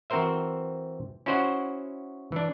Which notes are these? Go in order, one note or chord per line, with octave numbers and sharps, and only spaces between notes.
E3 C4 F#4 A#4 C5 E5
C#4 E4 F#4 C5 D#5 F#5
E3 D4